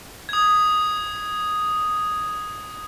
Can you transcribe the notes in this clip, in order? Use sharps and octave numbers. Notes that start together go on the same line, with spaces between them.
D#6 G#6